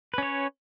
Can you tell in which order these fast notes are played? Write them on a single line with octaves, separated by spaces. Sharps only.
B4 C#4 C#5